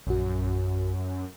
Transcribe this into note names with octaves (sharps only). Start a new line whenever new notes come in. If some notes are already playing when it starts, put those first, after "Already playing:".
A#1 F#2 F#4